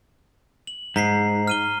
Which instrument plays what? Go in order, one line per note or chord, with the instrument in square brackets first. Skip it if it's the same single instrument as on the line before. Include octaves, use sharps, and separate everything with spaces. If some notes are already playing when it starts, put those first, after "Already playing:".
[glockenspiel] F#7
[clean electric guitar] G#2 [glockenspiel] A#5 B6 C7
[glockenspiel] F6 D#7 G7